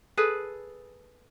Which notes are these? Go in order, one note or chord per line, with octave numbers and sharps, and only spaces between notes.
G#4 A4 B4